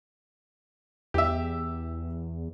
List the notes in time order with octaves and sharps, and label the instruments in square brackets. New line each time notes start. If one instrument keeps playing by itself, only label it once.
[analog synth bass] E2 [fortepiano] G4 E5